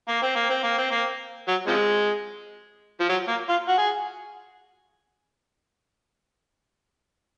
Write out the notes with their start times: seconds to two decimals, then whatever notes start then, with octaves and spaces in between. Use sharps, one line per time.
0.08 A#3
0.22 C4
0.36 A#3
0.50 C4
0.64 A#3
0.78 C4
0.91 A#3
1.48 F#3
1.68 C3 F3 G#3
3.00 F3
3.09 F#3
3.28 A#3
3.49 F4
3.68 F#4
3.78 G#4